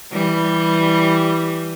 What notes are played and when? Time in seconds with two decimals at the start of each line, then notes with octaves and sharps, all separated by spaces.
0.12 E3 G3